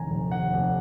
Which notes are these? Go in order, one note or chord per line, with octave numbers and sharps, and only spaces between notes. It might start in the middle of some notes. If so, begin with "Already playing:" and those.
Already playing: F1 D#2 D#3 G#5 A#5
F1
D#2 F#5
F1